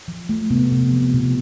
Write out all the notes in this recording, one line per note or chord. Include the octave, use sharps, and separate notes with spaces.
F3
A3
C3 B3
C3
F3
B2